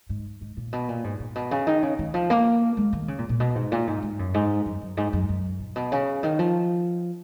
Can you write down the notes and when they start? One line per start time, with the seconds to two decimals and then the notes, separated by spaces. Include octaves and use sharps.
0.09 G#2
0.41 G#2
0.57 A#2
0.73 B2
0.89 A#2
1.04 G#2
1.20 A#2
1.35 B2
1.51 C#3
1.67 D#3
1.83 C#3
1.99 D#3
2.14 F3
2.30 A#3
2.77 G#3
2.93 D#3
3.08 C#3
3.18 A#2
3.29 A#2
3.40 B2
3.55 G#2
3.72 A#2
3.87 G#2
4.03 G#2
4.19 F#2
4.34 G#2
4.66 F#2
4.81 F#2
4.97 G#2
5.13 F#2
5.29 F#2
5.60 A#2
5.76 B2
5.92 C#3
6.23 D#3
6.39 F3